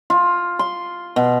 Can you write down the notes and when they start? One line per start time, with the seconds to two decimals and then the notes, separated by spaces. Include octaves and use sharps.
0.10 F4
0.59 C6
1.16 B2